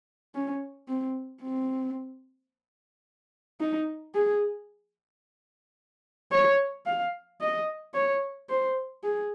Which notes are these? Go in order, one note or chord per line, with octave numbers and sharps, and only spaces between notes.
C#4
C4
C4
D#4
G#4
C#5
F5
D#5
C#5
C5
G#4